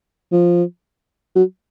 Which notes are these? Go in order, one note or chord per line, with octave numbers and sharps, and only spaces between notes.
F3
F#3